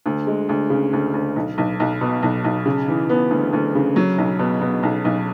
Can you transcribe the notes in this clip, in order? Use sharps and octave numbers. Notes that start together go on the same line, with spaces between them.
D2
G#3
D2
C#3
D2
D2
B1
B1
B1
B2
B1
B1
C#3
E3
B3
D2
D2
C#3
F#3
B1
B2
B2
B1
B1